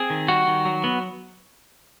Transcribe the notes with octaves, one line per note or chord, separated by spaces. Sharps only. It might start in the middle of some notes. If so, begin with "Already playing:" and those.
Already playing: C4 G#4
D#3
G3 F#4
D#3
F#3
B3